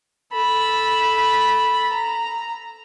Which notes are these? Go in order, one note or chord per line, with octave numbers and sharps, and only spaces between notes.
A4 B5
A#5